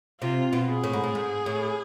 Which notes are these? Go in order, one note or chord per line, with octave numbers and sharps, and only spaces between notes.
C3 F4
B2
G#4
A2
G#2
A2
G#2
A2